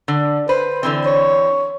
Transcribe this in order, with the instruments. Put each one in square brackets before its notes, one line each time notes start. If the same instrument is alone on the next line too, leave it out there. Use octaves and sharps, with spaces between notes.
[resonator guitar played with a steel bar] D3
[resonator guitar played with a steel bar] B4 [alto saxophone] C5
[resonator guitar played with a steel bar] D3 E3 C4
[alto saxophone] C#5